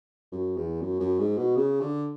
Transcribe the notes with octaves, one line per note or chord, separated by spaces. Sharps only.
F#2
E2
F#2
F#2
G#2
B2
C#3
D3